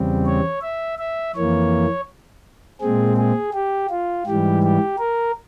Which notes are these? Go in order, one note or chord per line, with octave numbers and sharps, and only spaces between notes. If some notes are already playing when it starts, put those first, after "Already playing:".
Already playing: E2 C#3 G3 C4
C#5
E5
E5
F2 E3 A#3 C#5
A#2 G#3 C4 G#4
G#4
G4
F4
G#2 E3 G3 G4
G4
A#4